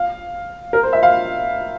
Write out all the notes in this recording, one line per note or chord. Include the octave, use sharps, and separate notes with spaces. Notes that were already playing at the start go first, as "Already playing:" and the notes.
Already playing: F5
A#4
C5
E5
F5